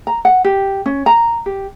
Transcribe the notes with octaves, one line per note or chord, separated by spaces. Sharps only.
A#5
F#5
G4
C#4
A#5
G4